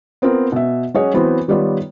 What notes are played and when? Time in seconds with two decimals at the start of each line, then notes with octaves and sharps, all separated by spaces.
0.22 B3 C4 F4 A#4
0.52 B2 E5
0.94 F#3 C#4 F#4 G#4 C#5 D#5
1.14 E3 F#3 B3 C4 B4 C5
1.48 D#3 G3 B3 F4 C#5 D5